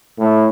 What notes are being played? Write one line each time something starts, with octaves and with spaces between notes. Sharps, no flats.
A2